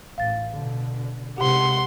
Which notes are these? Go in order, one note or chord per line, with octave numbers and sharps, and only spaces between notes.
A1 F5 A6
B2 D3
C3 G#3 G4 F#5 C6